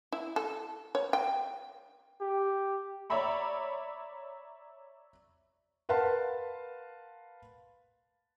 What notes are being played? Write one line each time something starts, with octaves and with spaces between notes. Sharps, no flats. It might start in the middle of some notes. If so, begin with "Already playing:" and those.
E4
A4
C#5
G5
G4
C#5 D5 E5 A#5 B5 C#6
A#4 B4 F5 F#5 A5 C6